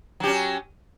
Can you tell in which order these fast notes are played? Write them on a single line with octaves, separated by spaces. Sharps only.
F#3 G4 C#4